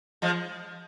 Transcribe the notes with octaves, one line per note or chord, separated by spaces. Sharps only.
F3 G#3